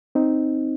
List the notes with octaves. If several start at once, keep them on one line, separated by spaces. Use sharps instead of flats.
C4 D#4